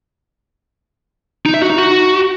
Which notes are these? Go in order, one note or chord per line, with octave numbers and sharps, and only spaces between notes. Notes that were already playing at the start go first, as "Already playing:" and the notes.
D#4
E5
F#4
D#4
F#4